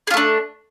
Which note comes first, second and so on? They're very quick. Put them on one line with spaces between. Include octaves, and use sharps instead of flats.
G#4 F4 A3 D4